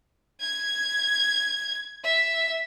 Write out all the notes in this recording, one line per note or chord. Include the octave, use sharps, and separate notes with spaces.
G#6
E5